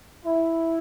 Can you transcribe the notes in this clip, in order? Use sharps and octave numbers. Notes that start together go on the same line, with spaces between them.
E4